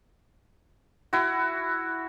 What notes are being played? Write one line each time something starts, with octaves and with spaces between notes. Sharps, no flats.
E4 F#4